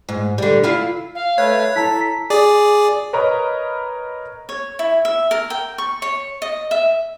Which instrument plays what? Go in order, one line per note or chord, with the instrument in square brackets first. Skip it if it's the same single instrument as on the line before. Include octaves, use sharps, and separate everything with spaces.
[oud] G#2
D3 G3
E4 F4 F5
[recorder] F5
[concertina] A3 B4 [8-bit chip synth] C#5
[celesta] E4 A5 A#5 [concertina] A4 [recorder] B6
[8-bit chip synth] G#4 D5
[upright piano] A#4 B4 C#5 D#5 A#5 B5
[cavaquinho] C#5
E4
E5
A#4
G5
C#6
C#5
D#5
E5